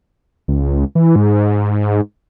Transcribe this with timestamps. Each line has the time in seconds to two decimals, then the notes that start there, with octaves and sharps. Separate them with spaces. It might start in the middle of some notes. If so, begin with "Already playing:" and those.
0.48 C#2
0.95 E3
1.16 G#2